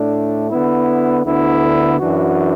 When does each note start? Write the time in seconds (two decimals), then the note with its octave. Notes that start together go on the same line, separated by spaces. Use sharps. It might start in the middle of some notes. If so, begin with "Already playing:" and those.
Already playing: A2 A3 D4
0.50 D3 B3 E4
1.25 D2 D3 B3 E4
1.99 F#2 E3 D4 F#4